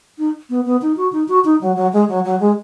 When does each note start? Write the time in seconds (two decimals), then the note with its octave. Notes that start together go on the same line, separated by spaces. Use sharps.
0.18 D#4
0.50 B3
0.66 B3
0.82 D#4
0.97 F#4
1.12 D#4
1.28 F#4
1.44 D#4
1.61 F#3
1.76 F#3
1.93 G#3
2.08 F#3
2.25 F#3
2.40 G#3